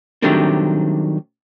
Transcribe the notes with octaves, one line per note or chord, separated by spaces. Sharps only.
D#3 F#3 G3 A3 C4 D4